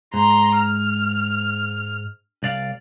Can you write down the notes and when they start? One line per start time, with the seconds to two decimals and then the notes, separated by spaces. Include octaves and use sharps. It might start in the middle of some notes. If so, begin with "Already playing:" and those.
0.14 G#2 A#5 C6
0.57 F6
2.43 C2 D5 F5